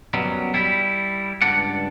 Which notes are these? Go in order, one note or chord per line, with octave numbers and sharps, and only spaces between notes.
F#2 B2 F#3 G3
G3 E4
C#2 G2 D4 D5 F#5